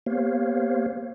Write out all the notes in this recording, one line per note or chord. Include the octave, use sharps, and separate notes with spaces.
A#3 B3 G4 C5 C#5 F5